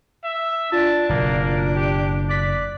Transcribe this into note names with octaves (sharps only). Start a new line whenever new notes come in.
E5
D4 F4 A5
F#1 B2 A#3
G4
D5 D6 F#6 B6